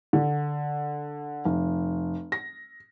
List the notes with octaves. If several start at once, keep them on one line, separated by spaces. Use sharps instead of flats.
D3
F1
A#6